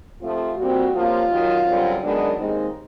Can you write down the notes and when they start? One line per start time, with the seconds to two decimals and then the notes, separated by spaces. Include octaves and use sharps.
0.21 C3 F3 A3 C4 F4
0.58 A#2 G3 C4 F#4
0.94 C3 F3 A#3 C#4 F4
1.30 F#2 D#3 F#3
1.66 F#2 D3 G3 C4
2.02 F#2 D#3 G#3 B3 D4
2.38 D#2 D#3 G#3 C4 D#4